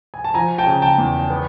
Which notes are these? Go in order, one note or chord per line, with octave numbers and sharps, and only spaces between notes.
G#5
A5
F3 G#5 A#5
G5 A5
C#3
G5 A5
E2
B3